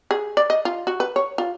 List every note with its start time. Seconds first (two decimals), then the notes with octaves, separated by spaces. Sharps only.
0.11 G#4
0.37 D5
0.50 D#5
0.65 F4
0.87 F#4
1.00 B4
1.16 C#5
1.38 F4